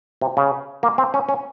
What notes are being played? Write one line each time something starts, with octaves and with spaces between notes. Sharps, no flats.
C3
C#3
A#3
C4
C#4
C#4